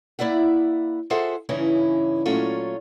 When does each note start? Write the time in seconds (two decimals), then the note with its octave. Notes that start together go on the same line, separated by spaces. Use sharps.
0.19 A#3 E4 D5 E5 F#5
1.10 F4 G#4 A4 C5 E5 F#5
1.49 G2 C#3 E3 C#4 D#4 E4
2.26 A#2 F#3 A3 C#4 F4 C#5